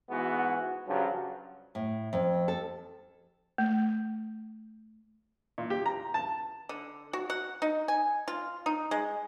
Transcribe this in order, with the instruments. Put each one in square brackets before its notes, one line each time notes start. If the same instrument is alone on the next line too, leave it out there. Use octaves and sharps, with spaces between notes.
[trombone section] G#2 E3 G#3 B3 F#4
G2 C#3 F3 F#3
[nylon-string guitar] A2
F2
A4
[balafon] A3
[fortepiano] A#2
G4
A#5
A5
[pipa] D3
F#4
F#5
D#4
G#5
F4
D#4
G#3